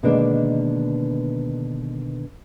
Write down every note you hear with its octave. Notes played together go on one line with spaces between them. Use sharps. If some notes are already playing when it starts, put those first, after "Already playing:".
B2 D3 D#3 G#3 A#3 D4